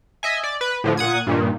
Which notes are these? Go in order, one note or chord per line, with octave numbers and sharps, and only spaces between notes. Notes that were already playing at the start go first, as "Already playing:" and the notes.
D#5 E5 G#5
D5
B4
A2 D3 F3
A#2 F#5 D#6 G#6
G2 A#2 D#3